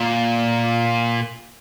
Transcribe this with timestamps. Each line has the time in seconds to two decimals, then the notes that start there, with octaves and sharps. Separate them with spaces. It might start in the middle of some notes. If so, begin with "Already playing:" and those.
Already playing: A#2